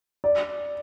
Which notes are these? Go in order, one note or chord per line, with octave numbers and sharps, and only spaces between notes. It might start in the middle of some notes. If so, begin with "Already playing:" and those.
D5